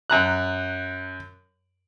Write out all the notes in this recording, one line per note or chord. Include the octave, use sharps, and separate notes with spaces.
F#2 A#5 F#6